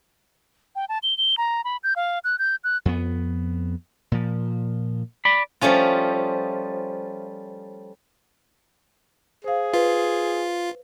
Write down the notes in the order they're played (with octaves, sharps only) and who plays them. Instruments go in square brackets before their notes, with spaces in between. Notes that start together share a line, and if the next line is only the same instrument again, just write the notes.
[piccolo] G5
A5
G7
G7
A#5
B5
G6
F5
F#6
G6
F#6
[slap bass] F2 B3
A#2 F3
[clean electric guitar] D5 B5
[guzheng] F3 G3 A3 C#4 F4
[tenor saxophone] G#4 [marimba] C5 F5
[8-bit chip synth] F4 [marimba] B4